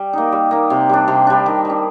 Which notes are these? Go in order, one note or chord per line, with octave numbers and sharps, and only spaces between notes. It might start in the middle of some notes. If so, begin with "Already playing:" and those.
Already playing: G3
A#3 D#4
G3
A#3 D#4
C3
G3 D4
C3
G3 D4
D#3
G3 D4